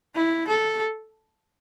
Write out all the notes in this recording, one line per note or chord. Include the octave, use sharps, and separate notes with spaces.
E4
A4